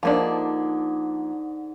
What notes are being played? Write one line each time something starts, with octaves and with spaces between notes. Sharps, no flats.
G#2 D3 F3 A#3 D4